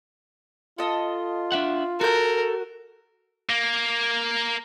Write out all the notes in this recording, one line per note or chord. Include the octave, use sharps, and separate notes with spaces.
F4 A4 D#5
D4 E5 F#5
F#4 A4 A#4 G6
A#3